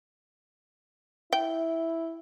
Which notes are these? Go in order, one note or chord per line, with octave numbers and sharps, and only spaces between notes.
E4 G5